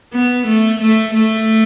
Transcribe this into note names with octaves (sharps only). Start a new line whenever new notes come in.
B3
A3
A3
A3